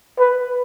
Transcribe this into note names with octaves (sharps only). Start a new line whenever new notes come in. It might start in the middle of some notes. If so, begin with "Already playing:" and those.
B4